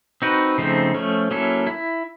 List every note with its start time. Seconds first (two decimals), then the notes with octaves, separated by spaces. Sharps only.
0.22 C4 D#4 F#4 B4
0.58 C#3 F3 A3 C4 D#4
0.94 F3 A3 C#4
1.31 F#3 A#3 C#4 E4 A4
1.67 E4